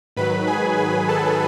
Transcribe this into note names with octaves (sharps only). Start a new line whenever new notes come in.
G#2 D#3 F#3 B4 B5
G#4 G#5
G#4 G#5
A4 A5